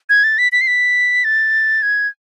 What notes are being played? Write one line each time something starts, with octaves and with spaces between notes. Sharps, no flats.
G#6
A6
B6
B6
C7
B6
A6
G#6